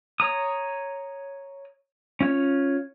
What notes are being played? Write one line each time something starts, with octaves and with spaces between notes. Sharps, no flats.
C#5 A#5 D#6
C#4 F4 C#5